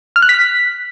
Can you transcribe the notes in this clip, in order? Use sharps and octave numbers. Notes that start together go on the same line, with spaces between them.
F6
F#6
B6